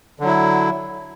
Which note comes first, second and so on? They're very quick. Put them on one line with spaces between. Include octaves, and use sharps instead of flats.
D3 F#3 E4